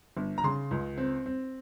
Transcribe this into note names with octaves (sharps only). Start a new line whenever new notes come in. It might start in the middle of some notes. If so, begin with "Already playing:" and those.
G1
A#5
C#3 C6
C#2
C4
C4